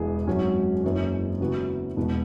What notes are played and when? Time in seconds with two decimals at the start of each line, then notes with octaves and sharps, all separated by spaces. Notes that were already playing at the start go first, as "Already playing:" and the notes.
Already playing: E1 E2 E3 B3 G#4
0.27 G#1 F#2 F#3 C#4
0.84 F#1 F#2 E3 C#4
1.40 C#3 E3 B3 F#4
1.97 E1 E2 B2 B3